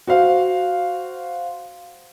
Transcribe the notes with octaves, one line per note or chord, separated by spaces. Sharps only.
F#4 C5 F5